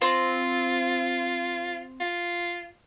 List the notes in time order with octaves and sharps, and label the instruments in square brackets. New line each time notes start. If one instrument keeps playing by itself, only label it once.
[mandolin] C4 [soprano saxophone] F4
[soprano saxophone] F4